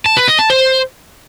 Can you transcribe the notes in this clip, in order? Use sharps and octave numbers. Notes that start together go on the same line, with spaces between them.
A5
B4
D#5
A5
C5